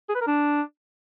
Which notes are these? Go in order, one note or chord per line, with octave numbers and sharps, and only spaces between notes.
G#4
B4
A#4
D4